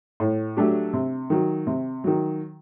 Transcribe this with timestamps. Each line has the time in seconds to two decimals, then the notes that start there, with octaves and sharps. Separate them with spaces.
0.20 A2
0.57 F#3 A3 D4 G4
0.93 C3
1.30 D#3 F#3
1.67 C3
2.04 D#3 F#3